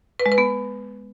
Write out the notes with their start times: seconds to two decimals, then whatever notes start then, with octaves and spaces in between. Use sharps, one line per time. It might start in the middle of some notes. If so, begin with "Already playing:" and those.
0.20 B4
0.26 G#3
0.32 B4
0.38 B3